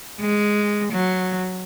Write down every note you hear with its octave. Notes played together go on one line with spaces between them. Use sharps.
G#3
F#3